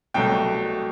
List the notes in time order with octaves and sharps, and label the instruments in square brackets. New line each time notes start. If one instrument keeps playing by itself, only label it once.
[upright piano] C2 B2 F#3 A3 G5